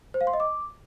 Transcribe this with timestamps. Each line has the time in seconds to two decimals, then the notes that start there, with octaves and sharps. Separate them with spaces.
0.14 C5
0.21 F5
0.27 C6
0.33 D#5
0.40 D6